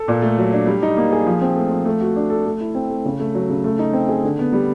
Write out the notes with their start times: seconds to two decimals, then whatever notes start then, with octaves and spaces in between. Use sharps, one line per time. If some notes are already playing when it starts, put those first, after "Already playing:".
Already playing: A4
0.08 A#2
0.22 A3
0.38 F#3
0.53 D4
0.67 G3
0.83 D#4
0.97 A#3
1.12 G#4
1.26 F3
1.42 C4
1.56 A3
1.71 F3
1.85 A3
2.01 F#4
2.16 D4
2.30 A4
2.45 A3
2.60 E4
2.75 C4
2.90 A3
3.05 C#3
3.20 A3
3.34 F#3
3.49 C#3
3.64 A3
3.79 D#4
3.93 C4
4.09 G#4
4.23 D3
4.39 B3
4.53 G3